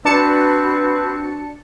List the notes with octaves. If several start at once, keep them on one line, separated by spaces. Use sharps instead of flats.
C4 D4 F#4 B4 A5 C#7